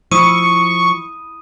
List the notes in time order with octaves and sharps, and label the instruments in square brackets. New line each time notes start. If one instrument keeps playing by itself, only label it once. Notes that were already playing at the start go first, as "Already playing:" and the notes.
[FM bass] F3 [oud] E4 [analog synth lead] C#6 [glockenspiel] D#6 D#7